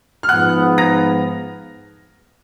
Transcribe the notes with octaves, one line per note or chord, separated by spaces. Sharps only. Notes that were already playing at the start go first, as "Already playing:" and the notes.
F6
G#2 F3 B3 F#5 F#6
A#5 A#6